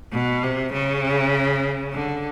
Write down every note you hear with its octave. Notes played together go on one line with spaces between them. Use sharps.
B2
C3
C#3
D3